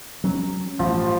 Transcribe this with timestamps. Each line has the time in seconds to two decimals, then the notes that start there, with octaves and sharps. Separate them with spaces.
0.24 F#3 C#4
0.79 A1 G2 F3